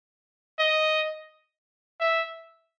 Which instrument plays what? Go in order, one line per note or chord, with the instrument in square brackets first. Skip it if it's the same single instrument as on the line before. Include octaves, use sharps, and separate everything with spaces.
[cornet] D#5
E5